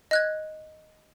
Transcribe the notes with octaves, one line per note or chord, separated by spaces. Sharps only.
D#5 F#6 G#6